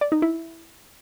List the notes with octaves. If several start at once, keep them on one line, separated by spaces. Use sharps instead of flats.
D5
D#4
E4